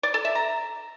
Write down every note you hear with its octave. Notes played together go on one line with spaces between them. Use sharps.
D5
A4
E5
A#5